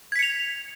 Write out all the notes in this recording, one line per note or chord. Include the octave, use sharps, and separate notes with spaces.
G#6 B6 C#7 F7